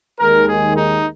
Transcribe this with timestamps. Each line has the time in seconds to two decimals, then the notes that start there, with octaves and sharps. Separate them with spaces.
0.20 D#2 D#3 G#3 A#4
0.49 G#4
0.77 D#4